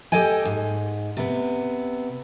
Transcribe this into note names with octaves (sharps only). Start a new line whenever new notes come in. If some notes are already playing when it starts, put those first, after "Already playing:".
G4 A4 D#5 G5 G#5
G#2
C3 B3